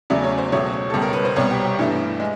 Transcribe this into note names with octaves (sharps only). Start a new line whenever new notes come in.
E2 C#3 F#3 A3 D5
C#5
C5
C#2 B2 F#3 A3 C#5
C#2 B2 G3 A4
A#4
B4
C5
C2 B2 G3 C#5
G4
G4
G2 E3 A3
G#3